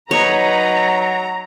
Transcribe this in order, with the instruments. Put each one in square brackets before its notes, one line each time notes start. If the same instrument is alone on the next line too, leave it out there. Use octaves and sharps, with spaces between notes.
[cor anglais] F#3 [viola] D#4 B4 [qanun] C#5 [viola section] A#5